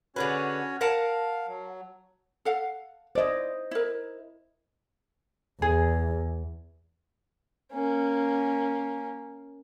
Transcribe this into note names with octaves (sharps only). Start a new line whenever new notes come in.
D3 C#4 F#4 G#4 B4 C#5
A#4 F5 F#5 A5
F#3
A4 F5 F#5
E4 C5 D5 D#5
E4 A#4
E2 G#4
A#3 C#4